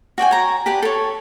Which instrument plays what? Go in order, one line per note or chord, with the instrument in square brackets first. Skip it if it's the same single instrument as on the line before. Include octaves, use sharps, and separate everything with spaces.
[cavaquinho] F#4 D5 G5 G#5
C#5 A#5
G4 B4 D5 A5
A4 C#5